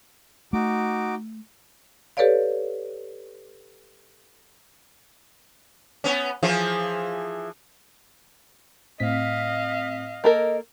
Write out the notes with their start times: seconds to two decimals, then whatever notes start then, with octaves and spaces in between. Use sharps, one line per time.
0.53 A3 D#4 F#4 D6
2.17 G4 A4 B4 C#5 D5 F5
6.04 B3 C#4
6.43 E3 F3 G#4
9.00 A2 C4 D#5 F5 B6
10.24 A#3 A4 A#4 D#5